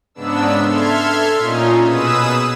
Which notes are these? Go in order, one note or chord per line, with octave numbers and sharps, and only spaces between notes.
G#2 C#3 B3 D4 E6
A4 E5 C6 F6 G#6
A#2 C#4 D#4 F4
B2 G#4 B4 D#6 E6 E7